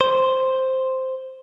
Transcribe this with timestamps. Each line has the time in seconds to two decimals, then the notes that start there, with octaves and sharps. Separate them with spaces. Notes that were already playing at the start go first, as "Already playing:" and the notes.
0.01 C5